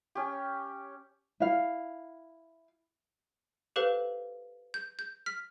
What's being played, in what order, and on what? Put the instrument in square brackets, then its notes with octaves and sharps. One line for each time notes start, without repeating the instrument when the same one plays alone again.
[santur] C#4 G4
[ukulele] E4 F5
[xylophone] G4 A4 B4 C5 F5
G6
G6
F6 B6